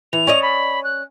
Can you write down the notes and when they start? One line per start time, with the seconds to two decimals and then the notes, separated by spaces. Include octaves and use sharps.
0.13 E3 F7
0.27 C#4 D5 D#5
0.43 B5
0.84 F#6